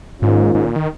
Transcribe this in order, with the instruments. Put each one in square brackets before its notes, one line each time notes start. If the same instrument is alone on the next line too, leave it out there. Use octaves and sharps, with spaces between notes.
[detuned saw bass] G#2 [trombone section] D#3 A#3 C#4 F4
[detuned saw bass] G#2
A#2
D#3